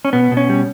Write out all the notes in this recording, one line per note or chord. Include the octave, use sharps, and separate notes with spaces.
C#4
B2 B3
B2
C#4
G3